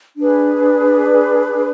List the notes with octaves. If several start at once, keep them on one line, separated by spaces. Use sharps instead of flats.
D4 G#4 B4